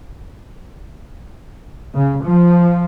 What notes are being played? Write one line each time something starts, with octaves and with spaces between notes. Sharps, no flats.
C#3
F3